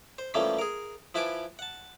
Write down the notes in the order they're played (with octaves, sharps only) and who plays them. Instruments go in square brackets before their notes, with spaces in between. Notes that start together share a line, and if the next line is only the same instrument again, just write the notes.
[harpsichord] C5
E3 F3 G3 A3 A#3 C#4
G#4 A#4
F3 E4 B4 G#5 A5 D6
F#5 A5